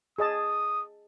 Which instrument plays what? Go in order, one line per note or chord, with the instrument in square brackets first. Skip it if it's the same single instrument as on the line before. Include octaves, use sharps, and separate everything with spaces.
[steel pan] G#4 D#5 A5 [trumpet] D#6